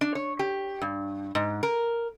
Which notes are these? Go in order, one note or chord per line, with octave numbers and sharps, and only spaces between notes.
D4
C#5
G4
G2
G#2
A#4